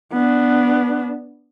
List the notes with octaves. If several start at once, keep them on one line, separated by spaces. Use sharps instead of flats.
B3 D4